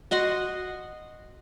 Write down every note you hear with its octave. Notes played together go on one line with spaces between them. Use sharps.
F#4 D#5 F#5 C6